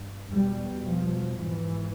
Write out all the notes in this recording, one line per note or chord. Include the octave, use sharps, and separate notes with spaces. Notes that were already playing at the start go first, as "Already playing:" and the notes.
Already playing: G2
E2 B2 G3
F3
G#2 E3